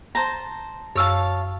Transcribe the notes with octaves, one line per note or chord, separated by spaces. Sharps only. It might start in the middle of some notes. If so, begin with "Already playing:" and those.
C5 A5 A#5
F#2 C#5 F5 A5 E6